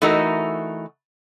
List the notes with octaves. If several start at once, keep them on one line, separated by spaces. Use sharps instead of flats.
E3 A3 D#4 F#4 A#4